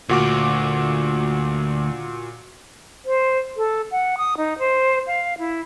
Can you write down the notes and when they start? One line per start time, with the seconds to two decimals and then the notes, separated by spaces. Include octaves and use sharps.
0.09 D2 A#2 F#4 D6
3.05 C5
3.57 A4
3.91 F#5
4.18 D#6
4.38 D#4
4.59 C5
5.07 F5
5.38 E4